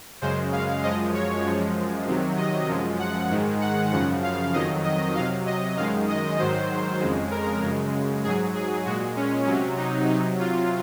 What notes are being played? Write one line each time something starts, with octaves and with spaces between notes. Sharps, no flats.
F#2 C#3 G#3 C5
F5
F#2 F3 G#3 D#5
C#5
F#2 F3 G#3
C3 D#3 F#3
D#5
F#2 F3 G#3
F#5
G#2 D#3 G#3
F#5
F#2 C#3 F3 F#5
F5
F2 D#3 F#3 D#5
D#5
C3 F#3 F5
D#5
F#2 D#3 G#3 F5
D#5
G#2 D#3 F#3 C5
F2 C#3 G#3
A#4
F#2 C#3 G#3
G#2 F#3 G#4
G#4
A#2 G#3 F#4
C#4
C3 F#3 C#4
D#4
C3 F#3 D#4
F4